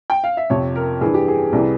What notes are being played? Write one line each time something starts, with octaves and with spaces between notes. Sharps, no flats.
G5
F5
E5
F2 C3 F3 C#5
A#4
G2 E3 G#4
G4
G#4
C2 C3 E3